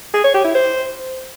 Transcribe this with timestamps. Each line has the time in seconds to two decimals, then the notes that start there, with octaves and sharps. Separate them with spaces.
0.14 G#4
0.24 C#5
0.34 G4
0.44 E4
0.55 C5